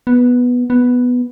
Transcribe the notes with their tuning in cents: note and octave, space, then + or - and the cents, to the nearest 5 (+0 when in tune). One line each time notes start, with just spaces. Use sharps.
B3 -5
B3 +0